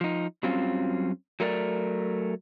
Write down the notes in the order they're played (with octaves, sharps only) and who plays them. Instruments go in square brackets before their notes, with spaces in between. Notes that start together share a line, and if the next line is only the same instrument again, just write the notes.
[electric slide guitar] F3 D#4
F#2 F#3 G3 C4 C#4 F4
F#3 A3 A#4 C5 D5